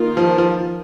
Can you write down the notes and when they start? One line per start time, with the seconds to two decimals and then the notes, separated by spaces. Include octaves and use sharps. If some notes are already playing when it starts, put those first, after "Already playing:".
Already playing: D#3 A#3 F4
0.17 F3
0.38 F3